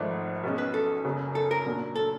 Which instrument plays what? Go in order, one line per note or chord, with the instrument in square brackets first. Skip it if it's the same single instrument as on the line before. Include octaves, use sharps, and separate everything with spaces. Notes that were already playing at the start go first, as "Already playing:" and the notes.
Already playing: [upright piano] G#1 G#2 F3 A3 [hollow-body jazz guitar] D5
[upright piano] B1 B2 G#3 C#4
[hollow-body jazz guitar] B4
A4
[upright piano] F#1 F#2 C#3
[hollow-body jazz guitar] A4
A#4
[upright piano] A#2 F#3 A#3 D4
[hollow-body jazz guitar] A4